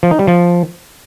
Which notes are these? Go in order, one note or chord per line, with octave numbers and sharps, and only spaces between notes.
F3
D#4
G3
F3